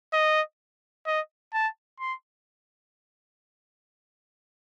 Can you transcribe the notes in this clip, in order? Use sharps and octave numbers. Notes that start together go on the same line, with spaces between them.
D#5
D#5
A5
C6